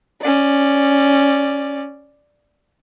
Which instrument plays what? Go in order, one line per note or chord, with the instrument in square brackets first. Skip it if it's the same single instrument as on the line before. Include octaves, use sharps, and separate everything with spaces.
[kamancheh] C#4 D5